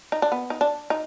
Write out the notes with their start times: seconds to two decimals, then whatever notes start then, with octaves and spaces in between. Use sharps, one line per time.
0.12 D#4
0.22 D4
0.32 B3
0.50 D#4
0.61 D4
0.90 D#4